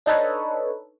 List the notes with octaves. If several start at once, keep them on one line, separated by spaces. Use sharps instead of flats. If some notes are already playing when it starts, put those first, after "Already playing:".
D4 D#4 A4 B4 C#5